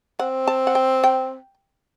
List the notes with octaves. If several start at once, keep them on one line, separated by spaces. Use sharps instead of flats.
C4 F#5
A5
F#5
G5
G5